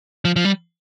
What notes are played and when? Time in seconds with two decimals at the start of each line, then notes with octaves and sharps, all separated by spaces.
0.25 F3
0.36 F3
0.45 G3